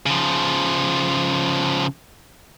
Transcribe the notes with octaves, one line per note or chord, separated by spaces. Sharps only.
C#3 F3